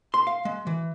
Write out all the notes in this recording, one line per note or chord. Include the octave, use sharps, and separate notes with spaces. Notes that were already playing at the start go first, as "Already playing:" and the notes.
C6
F5
G#3
E3